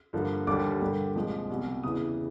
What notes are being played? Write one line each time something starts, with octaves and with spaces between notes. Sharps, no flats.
G2 D3 F3 A#3
D#2 D3 G3 A#3 D6
G2 D3 G3 A#3
C2 A#2 F3 G#3
C2 B2 G3
E2 C#3 E3 D#6